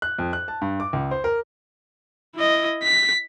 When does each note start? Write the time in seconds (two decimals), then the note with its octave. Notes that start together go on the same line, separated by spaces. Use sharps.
0.02 F#6
0.19 F2
0.33 F#6
0.48 A5
0.62 G2
0.80 D6
0.93 C#2
1.11 C5
1.24 A#4
2.35 E4 D#5
2.83 B6